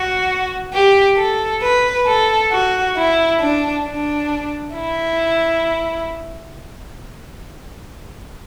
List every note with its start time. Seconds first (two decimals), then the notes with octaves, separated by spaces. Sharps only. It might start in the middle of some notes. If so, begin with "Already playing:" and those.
Already playing: F#4
0.73 G4
1.17 A4
1.62 B4
2.07 A4
2.52 F#4
2.97 E4
3.41 D4
3.85 D4
4.76 E4